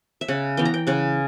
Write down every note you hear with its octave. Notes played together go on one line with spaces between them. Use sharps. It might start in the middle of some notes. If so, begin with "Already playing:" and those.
E5
C#3 F#5
E3 B3 G5
A#5
G5
C#3 F#5